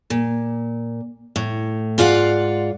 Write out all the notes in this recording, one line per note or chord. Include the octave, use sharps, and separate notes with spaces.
A#2
A2
G#2 F4 D5 F5 F#5